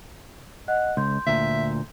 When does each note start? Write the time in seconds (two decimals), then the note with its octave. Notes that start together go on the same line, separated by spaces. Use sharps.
0.68 D#5 F#5 F#6
0.97 C#2 C6 G6
1.27 D2 A#2 E5